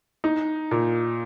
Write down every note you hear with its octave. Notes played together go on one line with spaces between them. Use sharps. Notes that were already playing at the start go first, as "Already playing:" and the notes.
D#4
A#2